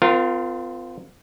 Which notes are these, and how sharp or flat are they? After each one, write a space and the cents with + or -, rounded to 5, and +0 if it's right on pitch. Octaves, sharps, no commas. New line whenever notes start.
C4 -40 F4 +0 A#4 -15